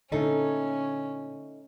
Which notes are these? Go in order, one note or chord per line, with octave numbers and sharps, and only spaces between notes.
A#2 D3 A3 C#4 D#4 A4